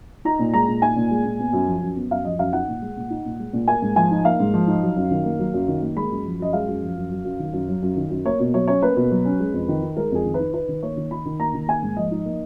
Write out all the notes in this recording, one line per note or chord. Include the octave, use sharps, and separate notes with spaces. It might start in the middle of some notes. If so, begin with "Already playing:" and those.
D#4 A#5
A#2
G#3 A#5
A#2
D#4 G#5
A#2
G#3
A#2
B3
F#2
F3
F#2
B3
F#2 F5
F3 D#5
F#2 F5
D#4 F#5
A#2
G#3
A#2
D#4
A#2
G#3
A#2
A#3 G#5
G#2
F3 G#5
D#4
A#3 F5
G#2
F3
D#4
F#3
F#2
D#3
A#3
F#3
F#2
D#3
A#3
G#3 B5
F#2
F3
F#2 D#5
G#3 F5
F#2
F3
F#2
F#3
F#2
D#3
F#2
F#3
F#2
D#3
F#2
A#3 C#5
B2
F#3 C#5
C#4 C#5
A#3 B4
B2
F#3
C#4
G#3
F2
D#3
D#4
G#3 A#4
F2 G#4
D#3
B4
D#4
D#4 B4
D#3
A#3 C#5
D#3
D#4 B5
D#3
A#3 A#5
D#3
A#3 G#5
G#2
F3 D#5
D#4
A#3